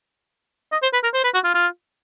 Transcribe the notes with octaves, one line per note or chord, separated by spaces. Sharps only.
D#5
C5
B4
A#4
C5
B4
F#4
F4
F4